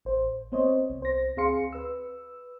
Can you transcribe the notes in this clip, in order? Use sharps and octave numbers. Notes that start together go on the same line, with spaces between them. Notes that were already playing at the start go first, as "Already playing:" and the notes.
A1 C5
B3 C4 C5 C#5 D#5
C2
C5 A#6
D2 C4 G#4 F5 C6 C#7
B4 E6